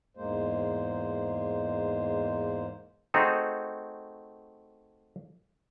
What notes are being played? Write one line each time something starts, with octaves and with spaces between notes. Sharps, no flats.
E2 G#2 G#3 A#3 C5
A3 C4 D#4 F#4 G#4 A4